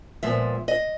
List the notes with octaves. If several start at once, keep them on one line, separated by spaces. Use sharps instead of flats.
A#2 F3 G#3 B3 E5
D#5